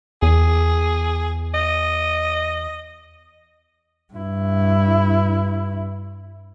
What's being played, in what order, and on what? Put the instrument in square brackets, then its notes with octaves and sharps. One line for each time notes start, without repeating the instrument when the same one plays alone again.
[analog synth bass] E2 [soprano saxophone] G#4
[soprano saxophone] D#5
[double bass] G2 E4